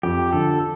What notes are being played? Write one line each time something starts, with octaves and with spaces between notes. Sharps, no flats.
F2 G4
D3 F3 A4